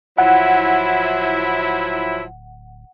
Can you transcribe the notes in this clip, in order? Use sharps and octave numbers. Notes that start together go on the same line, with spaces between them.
D1 F3 F#3 E4 F#5